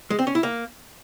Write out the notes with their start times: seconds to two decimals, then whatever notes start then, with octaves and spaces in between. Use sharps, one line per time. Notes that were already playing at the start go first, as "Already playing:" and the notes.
0.10 G#3
0.19 C4
0.27 C#4
0.35 E4
0.43 A#3